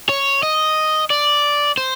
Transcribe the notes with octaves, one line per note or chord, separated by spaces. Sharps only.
C#5
D#5
D5
C5